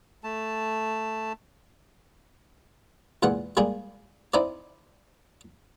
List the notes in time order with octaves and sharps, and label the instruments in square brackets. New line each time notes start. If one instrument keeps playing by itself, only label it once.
[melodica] A3 A5
[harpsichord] E2 A#2 G#3 F#5
G3 G#3 A#3 G#4
C4 D#4 E4 D5